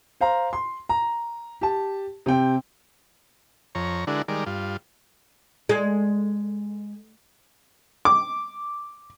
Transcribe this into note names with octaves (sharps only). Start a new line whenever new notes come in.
C5 F5 A#5
C6
A#5
G4 A5
C3 C4 G5
F2 C#5 A#5
D3 G#3 D4 E4 F#4 A#4
D#3 G3 G#3 A#4 D5
G2 F4
G#3
D6